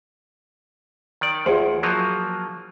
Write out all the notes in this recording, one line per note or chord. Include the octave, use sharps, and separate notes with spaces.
D#3 D5
E2 F4 G#4 C5
F3 F#3 A#3